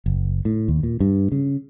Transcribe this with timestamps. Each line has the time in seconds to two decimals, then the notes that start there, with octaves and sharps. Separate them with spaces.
0.06 F#1
0.45 A2
0.68 D#2
0.83 A#2
1.00 G2
1.32 C#3